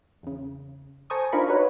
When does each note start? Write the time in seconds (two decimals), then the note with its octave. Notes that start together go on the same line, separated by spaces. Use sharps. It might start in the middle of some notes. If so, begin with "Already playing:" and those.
0.23 E2 C#3
1.10 A4 C5 G#5 A#5 C#6 D#6
1.32 D4 D#4 F4 A#4 B5 C#6
1.49 D#4 F#4 B4 C#5